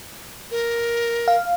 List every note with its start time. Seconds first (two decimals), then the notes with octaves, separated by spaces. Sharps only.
0.51 A#4
1.28 F5